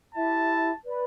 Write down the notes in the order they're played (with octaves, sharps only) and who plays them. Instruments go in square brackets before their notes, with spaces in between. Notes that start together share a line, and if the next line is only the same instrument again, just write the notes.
[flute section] E4 G4 E5 [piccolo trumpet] A5
[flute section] B4 D5 B5